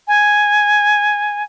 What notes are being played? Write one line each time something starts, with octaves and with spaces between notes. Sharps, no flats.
G#5